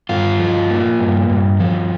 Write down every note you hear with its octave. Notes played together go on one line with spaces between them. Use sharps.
G2 F4
F3
A#3
G2
G2
F3